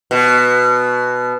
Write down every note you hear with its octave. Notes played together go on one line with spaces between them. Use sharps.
B2